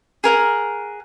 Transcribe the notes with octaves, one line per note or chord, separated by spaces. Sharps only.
G#4 A#4 F#5